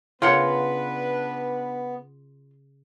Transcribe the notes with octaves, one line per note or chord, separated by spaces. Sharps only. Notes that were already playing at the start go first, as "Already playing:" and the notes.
C#3 B3 D4 F4 A#4 B4 F#5